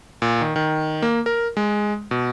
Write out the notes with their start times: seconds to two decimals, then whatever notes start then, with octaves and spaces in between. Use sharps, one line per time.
0.22 A#2
0.41 D#3
0.56 D#3
1.02 A#3
1.26 A#4
1.57 G#3
2.11 B2